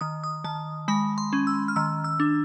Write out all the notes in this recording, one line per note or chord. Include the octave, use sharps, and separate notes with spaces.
D#3 D#6
D#6
D#3 A5
G#3 B5
C6
C#4
E6
F6
D#3 E6
E6
D4